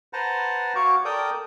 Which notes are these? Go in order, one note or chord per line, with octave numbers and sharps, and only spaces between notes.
B4 C5 F#5 A5 A#5
F#4 C#5 F5 C#6 D6
A4 A#4 D5 G5 D#6